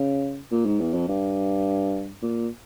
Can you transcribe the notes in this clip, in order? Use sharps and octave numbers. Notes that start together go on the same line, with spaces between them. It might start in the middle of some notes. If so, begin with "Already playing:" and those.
Already playing: C#3
A#2
G#2
E2
F2
G2
A#2